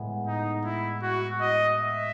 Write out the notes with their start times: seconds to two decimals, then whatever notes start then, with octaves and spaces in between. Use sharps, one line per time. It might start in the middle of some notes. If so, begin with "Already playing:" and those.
Already playing: A2 G#3 B3
0.27 D#4
0.64 E4
1.02 F#4
1.40 D#5
1.78 E5